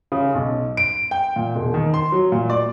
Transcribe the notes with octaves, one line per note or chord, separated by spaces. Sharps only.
C#3
B1
D7
G5
A#2
E1
D#3
C6
F#3
A#2
D5